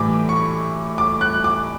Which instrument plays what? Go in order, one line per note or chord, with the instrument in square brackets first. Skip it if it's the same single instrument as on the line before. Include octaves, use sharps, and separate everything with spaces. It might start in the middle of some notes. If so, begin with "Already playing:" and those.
Already playing: [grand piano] A2 E3 G3 D6
C#6
D6
F#6
D6